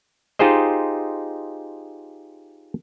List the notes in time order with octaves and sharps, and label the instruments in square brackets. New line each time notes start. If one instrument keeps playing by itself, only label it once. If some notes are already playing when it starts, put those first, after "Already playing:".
[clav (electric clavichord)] D#4 F4 G4 G#4 C5 D#5